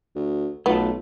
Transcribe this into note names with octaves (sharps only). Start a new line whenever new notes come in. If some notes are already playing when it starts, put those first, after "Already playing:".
D2
B1 A3 B3 F4 A4